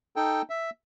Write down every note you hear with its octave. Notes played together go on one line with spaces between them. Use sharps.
D#4 A4 G5
E5